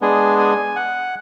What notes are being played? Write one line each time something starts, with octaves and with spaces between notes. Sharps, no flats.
G#3 B3 D4 G#4 G#5
G#5
F#5